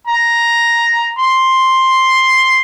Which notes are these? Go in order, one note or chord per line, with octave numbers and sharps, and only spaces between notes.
A#5
C6